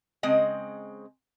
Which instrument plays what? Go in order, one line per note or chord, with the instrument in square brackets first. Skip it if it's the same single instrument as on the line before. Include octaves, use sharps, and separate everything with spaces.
[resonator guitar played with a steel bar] C#3 G#3 C4 D#5